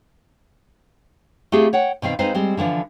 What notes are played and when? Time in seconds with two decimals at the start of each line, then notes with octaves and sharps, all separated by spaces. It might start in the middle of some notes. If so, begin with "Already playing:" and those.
1.52 A3 C4 E4 F4 G4 G#4
1.73 C#5 F#5 G5
2.02 B2 D#3 C4 F5
2.19 G#3 C4 D#4 B4 C5 F5
2.35 G3 G#3 C4
2.57 D3 E3 F3 D4